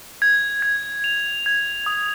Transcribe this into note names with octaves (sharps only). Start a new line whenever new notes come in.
G#6
G#6
F7
G#6
D#6